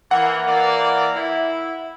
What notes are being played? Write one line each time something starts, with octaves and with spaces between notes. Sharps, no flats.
E3 A#3 F#5
E3 A#3 D5
E4